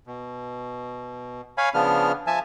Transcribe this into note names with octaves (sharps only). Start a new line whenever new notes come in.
B2
C#5 F5 G#5 B5
C#3 F3 B3 D4 F6
F3 E5 G#5 A5